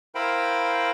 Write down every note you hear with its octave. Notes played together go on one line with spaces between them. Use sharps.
E4 A#4 C5 F5 G5 B5